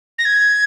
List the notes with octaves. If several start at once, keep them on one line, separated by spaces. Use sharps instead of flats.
A#6
G#6